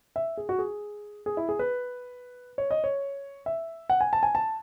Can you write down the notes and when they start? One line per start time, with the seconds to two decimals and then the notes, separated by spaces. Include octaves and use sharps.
0.16 E5
0.37 G#4
0.49 F#4
0.59 G#4
1.26 G#4
1.37 E4
1.49 G#4
1.59 B4
2.58 C#5
2.71 D#5
2.84 C#5
3.46 E5
3.90 F#5
4.01 G#5
4.13 A5
4.23 G#5
4.35 A5